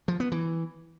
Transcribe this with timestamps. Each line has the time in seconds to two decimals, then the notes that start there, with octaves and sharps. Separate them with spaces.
0.08 F3
0.20 B3
0.32 E3